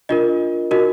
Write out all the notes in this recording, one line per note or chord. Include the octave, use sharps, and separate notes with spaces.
D4 F4 A#4 D#5
D#4 F#4 A#4 D#5